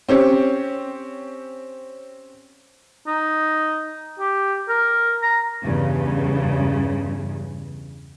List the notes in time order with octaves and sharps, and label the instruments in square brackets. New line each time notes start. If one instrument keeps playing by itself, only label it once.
[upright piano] C4 C#4 G4 C#5
[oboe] D#4
G4
A#4
A#5
[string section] E2 G2 C#3